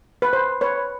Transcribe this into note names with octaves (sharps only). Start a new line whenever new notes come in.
B4
C5
B4 C#5